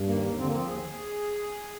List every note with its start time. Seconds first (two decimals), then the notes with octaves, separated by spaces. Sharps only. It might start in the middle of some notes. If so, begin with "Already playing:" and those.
Already playing: G2
0.08 D#2 A#3
0.24 D#2
0.38 D3 C4
0.47 A#3
0.53 F3 C4
0.68 D#2 G#4